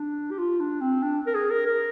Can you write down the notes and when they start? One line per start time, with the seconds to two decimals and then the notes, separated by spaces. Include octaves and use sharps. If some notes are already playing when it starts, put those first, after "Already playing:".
Already playing: D4
0.31 G4
0.39 F4
0.60 D4
0.81 C4
1.03 D4
1.26 A#4
1.34 G#4
1.50 A#4
1.66 A#4